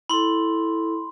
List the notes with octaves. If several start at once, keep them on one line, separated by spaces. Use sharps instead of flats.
E4 A4 B5 C6